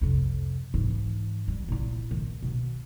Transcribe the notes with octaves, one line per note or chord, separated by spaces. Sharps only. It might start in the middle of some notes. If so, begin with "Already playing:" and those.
F2 C3
G#2 E3
G3
A#2 E4
D#3
B2